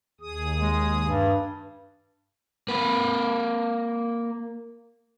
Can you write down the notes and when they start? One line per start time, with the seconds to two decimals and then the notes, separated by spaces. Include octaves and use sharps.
0.21 D#2 G#4 D#6
0.60 G#3
1.02 G2
2.68 A#3 B4